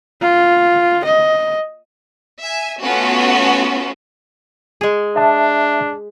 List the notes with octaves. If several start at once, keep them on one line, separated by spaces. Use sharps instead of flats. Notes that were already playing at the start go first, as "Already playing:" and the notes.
F4
D#5
E5 G#5
A3 B3 C#4 F4 F#4
G#3 G#4
D4 E5 A5